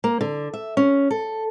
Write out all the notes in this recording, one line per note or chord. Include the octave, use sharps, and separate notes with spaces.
A#3
D3
E5
C#4
A4